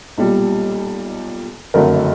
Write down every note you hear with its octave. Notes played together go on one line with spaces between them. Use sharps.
B1 A#2 G3
F#1 F2 D3 F#3 A3 A#4